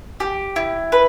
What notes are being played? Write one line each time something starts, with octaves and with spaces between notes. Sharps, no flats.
G4
E4
B4